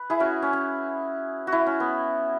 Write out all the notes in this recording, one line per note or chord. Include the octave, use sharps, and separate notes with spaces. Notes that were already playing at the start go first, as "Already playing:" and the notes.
Already playing: B4
E4 G#4
C#4 F#4
C#4
C#4
F#4
E4
C#4
B3